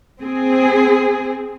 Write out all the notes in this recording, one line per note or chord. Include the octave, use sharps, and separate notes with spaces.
C4 G#4